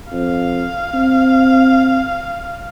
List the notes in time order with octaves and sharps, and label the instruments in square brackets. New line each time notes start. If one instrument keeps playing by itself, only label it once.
[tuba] F2 [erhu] F5
[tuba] C4